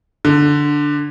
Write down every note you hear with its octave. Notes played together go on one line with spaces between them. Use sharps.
D3